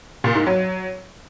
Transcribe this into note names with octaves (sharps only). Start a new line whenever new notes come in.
A#2
G#2
F#3